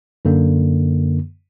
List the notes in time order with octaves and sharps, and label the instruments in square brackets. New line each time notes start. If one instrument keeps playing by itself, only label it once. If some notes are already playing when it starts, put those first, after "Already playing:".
[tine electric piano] F#2 D3 A#3